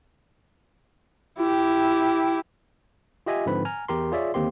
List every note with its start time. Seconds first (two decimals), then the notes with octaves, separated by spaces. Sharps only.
1.38 E4 G4
3.26 F4 G4 D#5 E5 G#5
3.46 G#2 D3 F3 C4 B4 B5
3.65 G#5 A#5 F6
3.88 E2 G4 A#4 A#5 C6
4.12 F4 G#4 C#5 D5 E5
4.34 D#2 D3 A#3 C4 G4 C6